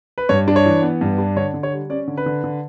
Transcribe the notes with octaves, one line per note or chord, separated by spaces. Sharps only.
B4
G2 C#5
D4
C#5
E3
B3
G2
D4
D3 C#5
D3
C#5
G3
C#4 D5
D3
B4
D3
D3